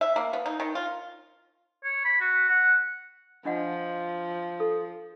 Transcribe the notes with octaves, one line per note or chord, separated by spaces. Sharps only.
E5
A#3
B3
D#4
D#3
F4
C#5
B5
F#4
F#5
F3 D4 D#5 F#5
A4